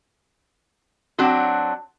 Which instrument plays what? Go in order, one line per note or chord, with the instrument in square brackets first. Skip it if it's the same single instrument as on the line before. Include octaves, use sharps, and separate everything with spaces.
[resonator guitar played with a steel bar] F#3 C4 D4 F#4